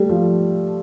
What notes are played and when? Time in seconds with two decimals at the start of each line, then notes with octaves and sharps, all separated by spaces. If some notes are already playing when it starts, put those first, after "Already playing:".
Already playing: G3 A3
0.09 F3